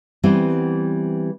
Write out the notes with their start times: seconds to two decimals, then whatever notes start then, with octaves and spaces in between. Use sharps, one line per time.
0.23 E3 G3 B3 C4